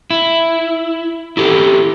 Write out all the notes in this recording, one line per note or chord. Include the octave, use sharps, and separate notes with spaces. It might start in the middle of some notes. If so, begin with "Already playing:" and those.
E4
E4 G4 A4